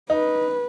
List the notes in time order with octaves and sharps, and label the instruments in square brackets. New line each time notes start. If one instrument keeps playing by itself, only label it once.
[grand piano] D#4 [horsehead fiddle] B4